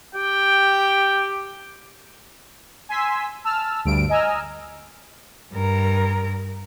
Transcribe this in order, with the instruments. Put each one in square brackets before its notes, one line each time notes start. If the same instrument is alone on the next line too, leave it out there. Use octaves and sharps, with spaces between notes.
[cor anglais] G4 [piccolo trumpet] G5
[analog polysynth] G#5 C6 E6 B6
A5 E6 F6
D2 G2 D7
D#5 G#5 A#5 E6 F6
[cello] G2 A#4